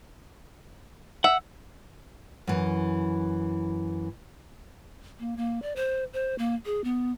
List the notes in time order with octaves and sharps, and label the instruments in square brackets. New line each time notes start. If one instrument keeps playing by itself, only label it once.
[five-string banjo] E5 [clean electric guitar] F#5
[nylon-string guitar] F#2 E3
[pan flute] A#3
A#3
D5
C5
C5
A#3
G#4
B3